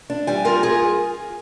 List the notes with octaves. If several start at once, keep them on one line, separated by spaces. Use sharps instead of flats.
D4
G3 G#5
F4 A#4
F4 G#4